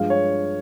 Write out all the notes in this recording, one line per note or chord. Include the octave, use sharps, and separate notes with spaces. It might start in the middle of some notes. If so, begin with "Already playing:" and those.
Already playing: G2 F3 G#3 F5
C#5